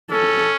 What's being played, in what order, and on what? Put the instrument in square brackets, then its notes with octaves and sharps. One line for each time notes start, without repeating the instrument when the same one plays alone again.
[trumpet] C#4 [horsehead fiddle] A4